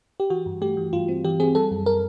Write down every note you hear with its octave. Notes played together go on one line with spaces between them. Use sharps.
G4
E3 F#4
G2
A3 G4
E3
G2 F4
C4
E3 G4
C4 G#4
G3 A4
F#2
A#4